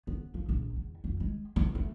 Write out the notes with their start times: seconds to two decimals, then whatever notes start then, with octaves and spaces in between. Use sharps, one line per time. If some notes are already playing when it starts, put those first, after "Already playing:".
0.07 B3
0.34 F3
0.49 A#1
0.76 E2
1.04 F2
1.20 G#3
1.56 E3
1.75 A3